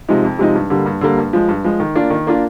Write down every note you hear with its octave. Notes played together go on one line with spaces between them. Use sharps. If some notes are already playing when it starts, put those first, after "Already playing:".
C3 F3 G#3 D#4
F2
C3 F3 G#3 D#4
G2
D3 G3 A#3
G2
D3 G3 A#3
G2
F3 G#3
G2
F3 G#3
D#3
A#3 D4 F4
D#3
A#3 D4 F4